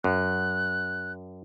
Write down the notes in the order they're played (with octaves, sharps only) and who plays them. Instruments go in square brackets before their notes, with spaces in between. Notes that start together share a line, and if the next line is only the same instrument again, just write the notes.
[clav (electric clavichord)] F#2 [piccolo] F#6